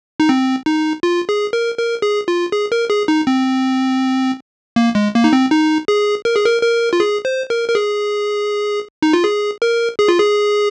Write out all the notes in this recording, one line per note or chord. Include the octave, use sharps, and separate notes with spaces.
D#4
C4
D#4
F4
G#4
A#4
A#4
G#4
F4
G#4
A#4
G#4
D#4
C4
A#3
G#3
A#3
D#4
C4
D#4
G#4
A#4
G#4
A#4
A#4
F4
G#4
C5
A#4
A#4
G#4
D#4
F4
G#4
A#4
G#4
F4
G#4